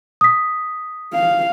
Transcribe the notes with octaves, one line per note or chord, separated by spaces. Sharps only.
D#6 B6
F5